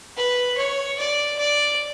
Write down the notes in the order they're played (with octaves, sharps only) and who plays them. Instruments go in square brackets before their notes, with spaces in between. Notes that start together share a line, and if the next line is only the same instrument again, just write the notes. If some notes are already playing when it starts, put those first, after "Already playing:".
[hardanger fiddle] B4
C#5
D5
D5